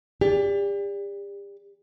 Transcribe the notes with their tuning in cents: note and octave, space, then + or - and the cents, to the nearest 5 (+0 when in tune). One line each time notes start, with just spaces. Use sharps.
G4 +40 D5 -10